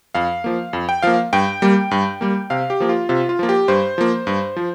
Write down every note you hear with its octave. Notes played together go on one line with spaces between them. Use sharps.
F2 F5
F3 A#3
F2
G5
F3 A#3 F5
G2 G5
G3 A#3
G2
G3 A#3
C3 F5
G4
F3 A#3
F4
C3 F4
F4
F3 A#3
G4
G2 C5
F3 A#3
G2
F3